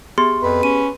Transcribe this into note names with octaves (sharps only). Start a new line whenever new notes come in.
B3 G4 G#4 C6
F2 B4
C#4 D#7